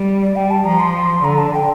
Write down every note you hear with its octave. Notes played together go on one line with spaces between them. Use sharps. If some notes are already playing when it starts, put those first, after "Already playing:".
Already playing: G3
D5
G3 G5
A5
F3 A#5
C6
D3 A#5
A5
G5